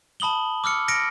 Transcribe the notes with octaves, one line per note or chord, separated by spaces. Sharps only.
A5 B5 D#6 F#7 G7
D6 E6 F6 C#7
F6 A#6 C#7 D7